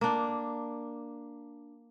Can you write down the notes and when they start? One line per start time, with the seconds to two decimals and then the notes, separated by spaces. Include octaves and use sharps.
0.01 A#3 D4